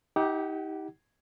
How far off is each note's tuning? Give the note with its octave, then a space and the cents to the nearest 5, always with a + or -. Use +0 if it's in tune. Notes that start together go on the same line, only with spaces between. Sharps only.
D#4 +35 G4 +0 F#5 +30